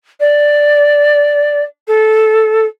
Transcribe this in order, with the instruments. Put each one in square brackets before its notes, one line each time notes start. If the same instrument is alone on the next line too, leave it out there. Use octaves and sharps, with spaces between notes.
[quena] D5
A4